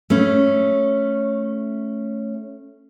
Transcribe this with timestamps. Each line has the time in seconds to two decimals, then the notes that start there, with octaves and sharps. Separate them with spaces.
0.10 A3 C#4